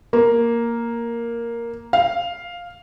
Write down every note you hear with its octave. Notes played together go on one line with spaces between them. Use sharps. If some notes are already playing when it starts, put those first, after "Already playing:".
A#3
F5